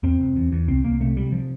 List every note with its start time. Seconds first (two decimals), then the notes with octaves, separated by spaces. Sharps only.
0.03 E2 C4
0.20 F1
0.36 E2
0.52 E2
0.68 C2 C4
0.84 C2 A#3
1.00 C3 A3
1.16 C3 G3
1.32 F3